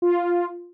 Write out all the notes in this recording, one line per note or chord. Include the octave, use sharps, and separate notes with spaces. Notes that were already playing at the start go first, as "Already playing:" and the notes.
F4